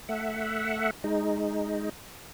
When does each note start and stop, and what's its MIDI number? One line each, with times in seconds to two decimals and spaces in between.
0.09 0.91 57
0.09 0.91 76
0.09 0.91 78
1.04 1.89 56
1.04 1.89 63